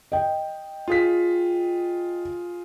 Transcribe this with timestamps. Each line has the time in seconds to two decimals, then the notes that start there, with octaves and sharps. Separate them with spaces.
0.12 D#5 G5
0.88 F4 G#4 B6